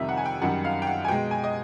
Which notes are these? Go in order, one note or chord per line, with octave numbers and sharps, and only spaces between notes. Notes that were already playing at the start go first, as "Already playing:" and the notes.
Already playing: F2 C3 D#3 G3 E5
F#5
G#5
G5
F#2 D#3 G3 F#5
F5
G5
F#5
G#5
B2 G#3 G5
G#5
D#5